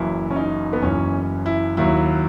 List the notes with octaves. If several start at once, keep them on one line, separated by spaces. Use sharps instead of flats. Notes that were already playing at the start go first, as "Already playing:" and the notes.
Already playing: F#1 F#2 E3 E4
C#4
D#4
B3
F#1 F#2 E3 C#4
E4
D#2 D#3 F#3 E4